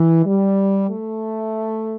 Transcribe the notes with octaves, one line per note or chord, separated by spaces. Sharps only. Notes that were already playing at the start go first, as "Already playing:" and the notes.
Already playing: E3
G3
A3